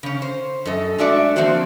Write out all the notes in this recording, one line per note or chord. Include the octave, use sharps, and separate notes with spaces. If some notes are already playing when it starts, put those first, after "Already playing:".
C#3 C#4
C5
F#2 A4 D#5
G#3 A3 D4 F#4 D5 E5
F3 A#3 C4 D4 F#4 C5